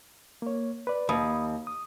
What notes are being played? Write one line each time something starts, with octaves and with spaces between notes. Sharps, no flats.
A#3 C#5
B4 D5
D#2 B5 D#6
D#6